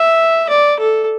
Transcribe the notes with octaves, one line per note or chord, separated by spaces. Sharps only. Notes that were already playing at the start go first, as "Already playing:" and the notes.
Already playing: E5
D5
A4